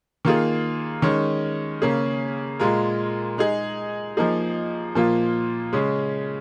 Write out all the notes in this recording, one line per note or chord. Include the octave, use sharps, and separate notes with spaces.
D#3 A#3 F4 G#4
D#3 G#3 C#4
C#3 A#3 C#4 G#4
A#2 G#3 F4 A#4
G#3 D#4 G#4
F3 A#3 D#4 G#4
A#2 F3 A#3 F4
C#3 G#3 C#4